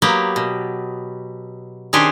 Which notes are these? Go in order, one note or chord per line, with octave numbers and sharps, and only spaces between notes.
F#3 A#3 B3 G4
B2
D#3 C#4 D4 G4 G#4 C5